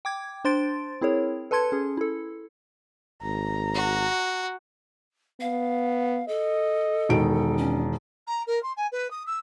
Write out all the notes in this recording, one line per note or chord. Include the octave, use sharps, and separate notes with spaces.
G5 D6 G#6
D4 C5 C6 A6 D7
C4 E4 G#4 A#4 C#5
A4 B4 A5 C6 G#6 C#7
C#4 G#4
E4 A4
G#1 A#5
F#4
B3 F5
A4 D#5
E1 D#3 D7
C#4 D4
A#5
A#4
C6
G#5
B4
D#6
E6